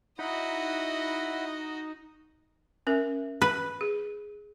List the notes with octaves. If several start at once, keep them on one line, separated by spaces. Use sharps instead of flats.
D#4 E4 F#4 D#5 F#5 B5
C#4 A#4 E5
B4
G#4